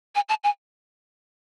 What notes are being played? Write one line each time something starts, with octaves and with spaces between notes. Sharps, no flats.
G#5
A5
G#5